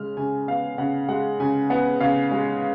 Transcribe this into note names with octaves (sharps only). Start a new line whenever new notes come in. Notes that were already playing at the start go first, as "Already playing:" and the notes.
Already playing: C#3 G#3 F6
C#3 G#5
B3 F5
C#3 F#5
G#3 F#5
C#3 G#5
B3 F#5
C#3 F5
G#3